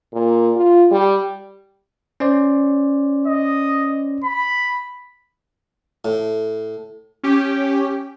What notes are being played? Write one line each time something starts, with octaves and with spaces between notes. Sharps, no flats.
A#2
F4
G3
C#4 C5 D5
D#5
B5
A2
C#4 G4